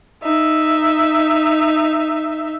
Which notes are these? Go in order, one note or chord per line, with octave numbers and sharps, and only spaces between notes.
D#4 E5